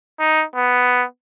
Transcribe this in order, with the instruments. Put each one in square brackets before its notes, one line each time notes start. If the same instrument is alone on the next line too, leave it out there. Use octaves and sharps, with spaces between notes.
[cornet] D#4
B3